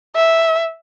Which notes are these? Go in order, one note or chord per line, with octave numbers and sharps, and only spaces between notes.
E5